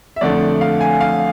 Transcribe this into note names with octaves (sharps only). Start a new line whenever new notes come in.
E5
F2 D3 A3 D4 D5
F5
G#5
F5